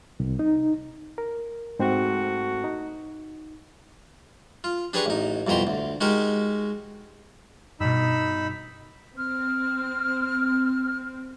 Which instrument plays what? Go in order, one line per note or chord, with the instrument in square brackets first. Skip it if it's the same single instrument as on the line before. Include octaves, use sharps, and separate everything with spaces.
[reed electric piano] C2
D#4
A#4
[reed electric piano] G#2 C4 [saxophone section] A3 F#4
[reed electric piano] D#4
[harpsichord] F4
D4 G4 G#4 B4 A#5 C#6
A1 D#4
C2 F2 B2 G4 A#5 C6
D2
G#3 D#4 F#4 G4 A#4
[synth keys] G2 B2 [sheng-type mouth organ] D#4 B5 E6
[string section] C4 [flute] F6